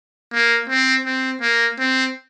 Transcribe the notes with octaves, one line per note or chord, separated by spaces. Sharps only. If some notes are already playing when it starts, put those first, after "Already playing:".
A#3
C4
C4
A#3
C4